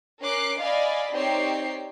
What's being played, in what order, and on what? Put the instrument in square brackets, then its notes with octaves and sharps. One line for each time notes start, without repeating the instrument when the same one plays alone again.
[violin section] C#4 A#4 D6 F#6 C7
D5 D#5 F5 G#5 B5
C4 D#4 G4 C#5 D5 C7